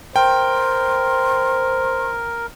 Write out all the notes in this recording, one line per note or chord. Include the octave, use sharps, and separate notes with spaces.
A#4 C5 G5 C6